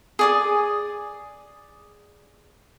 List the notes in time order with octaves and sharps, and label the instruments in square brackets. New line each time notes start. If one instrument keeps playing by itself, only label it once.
[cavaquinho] G#4 D5 D#6